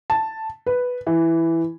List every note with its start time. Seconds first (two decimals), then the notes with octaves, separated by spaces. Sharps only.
0.10 A5
0.66 B4
1.07 E3